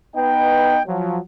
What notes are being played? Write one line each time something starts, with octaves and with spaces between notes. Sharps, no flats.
B3 D#4 B4 D#5 G5
F3 F#3